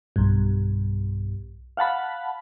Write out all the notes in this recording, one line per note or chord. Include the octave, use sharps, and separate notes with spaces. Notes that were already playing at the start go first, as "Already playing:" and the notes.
B1 G2
F5 F#5 A5 B5